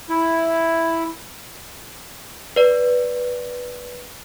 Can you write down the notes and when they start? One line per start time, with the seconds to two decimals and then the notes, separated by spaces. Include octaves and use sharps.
0.09 E4
2.56 B4 D5